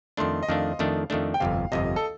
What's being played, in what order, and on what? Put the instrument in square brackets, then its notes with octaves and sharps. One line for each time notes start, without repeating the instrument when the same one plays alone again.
[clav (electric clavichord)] F2 D#3 A3 D4 [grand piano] C6
[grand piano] D#5
[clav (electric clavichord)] F2 D#3 A3 D4 [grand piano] F5
[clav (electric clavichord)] F2 D#3 A3 D4
F2 D#3 A3 D4
[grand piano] G5
[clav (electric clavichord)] G1 F2 C3 [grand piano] F5
[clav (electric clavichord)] G1 F2 C3 [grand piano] D#5
[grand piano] A4